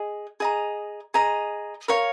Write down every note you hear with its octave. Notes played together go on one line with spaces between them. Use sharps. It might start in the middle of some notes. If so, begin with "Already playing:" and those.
Already playing: G#4 D#5
G#4 D#5 A#5
G#4 D#5 A#5
A#4 C#5 F5 C#6